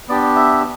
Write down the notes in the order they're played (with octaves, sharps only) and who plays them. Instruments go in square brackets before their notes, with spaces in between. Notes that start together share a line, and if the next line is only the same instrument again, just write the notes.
[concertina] B3 D4 G4 D5
E5